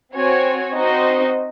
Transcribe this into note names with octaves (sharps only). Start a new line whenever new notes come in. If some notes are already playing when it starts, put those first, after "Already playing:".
C4 F#4 C#5 G#5
C4 D#4 F#4 C5 D#5